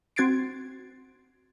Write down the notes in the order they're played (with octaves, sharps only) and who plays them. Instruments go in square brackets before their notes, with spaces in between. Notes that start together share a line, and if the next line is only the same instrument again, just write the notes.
[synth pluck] C4 F#4 G#6 A6 C7 D7